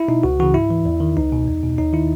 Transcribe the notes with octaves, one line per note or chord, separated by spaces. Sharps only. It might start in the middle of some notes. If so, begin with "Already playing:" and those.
Already playing: E4
B2 D#4
C#2 F#4
C#3 E3 F#4
G#2 E4
E3
E2
D#3
C#2 D#4
B2
E2
B2
D#2 D#4
D#3 E4